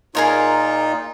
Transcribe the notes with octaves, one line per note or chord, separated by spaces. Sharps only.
A#2 D#4 F4 G#4 A#4 C#5